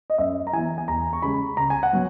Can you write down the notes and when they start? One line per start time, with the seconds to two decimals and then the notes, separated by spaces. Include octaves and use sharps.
0.10 D#5
0.18 F#2 E5
0.47 A#5
0.53 E3 B3 G#5
0.78 G#5
0.88 E2 A#5
1.13 C#6
1.22 C#3 G#3 B5
1.57 C#2 A#5
1.70 G#5
1.83 F#5
1.92 F#3 B3